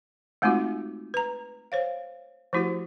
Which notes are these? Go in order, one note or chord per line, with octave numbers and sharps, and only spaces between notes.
G#3 A3 C4 D#4 F4 F#4
B4 A#5
C5 C#5 F5
F3 A3 E4 F#4 G4 C5